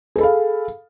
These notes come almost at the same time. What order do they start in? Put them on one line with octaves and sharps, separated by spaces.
G#4 A4 B5 F5